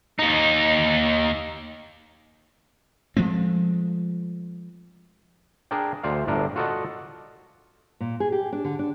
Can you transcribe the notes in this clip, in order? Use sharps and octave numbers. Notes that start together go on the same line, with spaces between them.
D#2 D#4
F3 G#3 A3 C4
D4 G#4 A#4 D5 G5
D2 C5 D5 F5
G1 A2 D4 A#4
F4 F#4 A4 D5 D#5 F#5
A#2
G#4
G4
D4
D3
D4